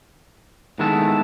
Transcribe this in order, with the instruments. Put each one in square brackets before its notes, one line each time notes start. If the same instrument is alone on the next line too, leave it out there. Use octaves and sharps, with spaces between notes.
[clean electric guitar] D#3 G#3 B3 E4 A4